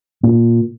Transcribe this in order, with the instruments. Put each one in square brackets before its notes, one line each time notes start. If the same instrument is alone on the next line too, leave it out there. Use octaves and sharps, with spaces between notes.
[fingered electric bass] A#2